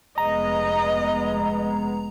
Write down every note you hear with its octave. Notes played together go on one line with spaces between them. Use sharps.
F1 G#3 B3 D#5 A#5